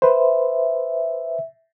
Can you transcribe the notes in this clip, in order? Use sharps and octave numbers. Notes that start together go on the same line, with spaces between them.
B4 C5 E5